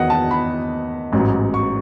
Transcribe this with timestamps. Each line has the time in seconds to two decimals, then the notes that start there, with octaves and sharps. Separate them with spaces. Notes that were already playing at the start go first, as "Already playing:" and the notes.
Already playing: E2 D#3 F#3 D#5 F#5
0.10 A5
0.31 B5
1.12 A1 G#2 F#3
1.54 C#6